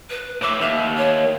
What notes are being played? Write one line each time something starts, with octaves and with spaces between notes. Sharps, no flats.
B4
A2 E5 D6
D#2 E5
C#5